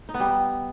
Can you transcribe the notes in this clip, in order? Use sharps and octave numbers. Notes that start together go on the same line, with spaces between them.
D#4
B3
G3